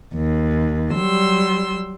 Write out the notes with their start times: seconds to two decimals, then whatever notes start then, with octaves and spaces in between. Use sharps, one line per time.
0.15 D#2
0.94 F#3 G3 C6 E6